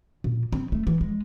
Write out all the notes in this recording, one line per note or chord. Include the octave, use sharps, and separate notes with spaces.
A#2
C4
A3
E3
G#3